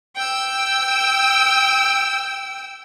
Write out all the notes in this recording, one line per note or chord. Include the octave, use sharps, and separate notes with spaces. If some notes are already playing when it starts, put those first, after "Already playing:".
G5 E6